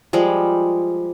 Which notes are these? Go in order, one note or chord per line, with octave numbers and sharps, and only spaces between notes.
F3 G3 G#3